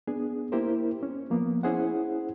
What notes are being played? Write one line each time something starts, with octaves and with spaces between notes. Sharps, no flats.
B3 D4 G#4
A#3 E4 G4 A#4 C5
C#4
F3 A#3 B3
C#4 E4 G#4 C5 F#5